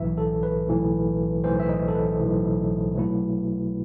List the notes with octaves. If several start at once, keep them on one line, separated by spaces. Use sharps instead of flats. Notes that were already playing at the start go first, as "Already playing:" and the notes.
Already playing: B1 A2 E3 E5
A4
B4
B1 A2 E3
B1 A2 E3 C5
E5
D#5
A4
B4
B1 A2 E3
B2 F#3 A3 E4